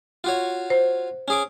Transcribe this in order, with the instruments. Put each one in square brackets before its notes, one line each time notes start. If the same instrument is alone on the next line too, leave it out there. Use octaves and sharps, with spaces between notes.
[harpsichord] F4 F#4 C#5
[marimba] C5
[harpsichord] C#4 G#4 D6